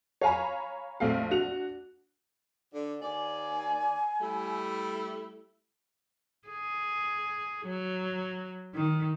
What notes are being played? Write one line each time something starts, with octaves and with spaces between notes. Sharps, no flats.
C#5 F5 G#5 A#5 B5
A#1 F2 A3 F5
D4 F#4 F7
D3
D#2 D5 G#5
G3 A3 E4
G#4
F#3
D#3